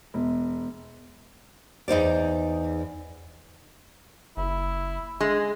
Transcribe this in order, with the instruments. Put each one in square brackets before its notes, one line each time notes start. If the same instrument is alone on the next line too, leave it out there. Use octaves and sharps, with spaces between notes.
[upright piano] E1
[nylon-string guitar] E2 D#4 C5 D5
[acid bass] F#1 [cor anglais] E4
[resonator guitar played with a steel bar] G#3 [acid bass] D4